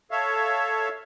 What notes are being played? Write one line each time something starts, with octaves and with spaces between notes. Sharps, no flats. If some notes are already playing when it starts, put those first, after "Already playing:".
A4 C#5 E5 F5